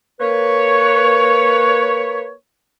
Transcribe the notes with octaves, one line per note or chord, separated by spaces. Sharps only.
A#3 B4 C#5